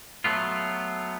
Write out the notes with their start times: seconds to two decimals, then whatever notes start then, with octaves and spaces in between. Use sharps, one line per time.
0.24 F#3 A3 B3 F4